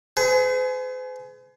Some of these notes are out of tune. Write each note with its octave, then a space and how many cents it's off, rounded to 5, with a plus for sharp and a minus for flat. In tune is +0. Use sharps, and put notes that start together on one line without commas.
G#4 +30 C5 -45